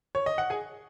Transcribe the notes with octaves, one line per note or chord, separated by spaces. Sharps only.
C#5
D#5
F#5
G#4 G#5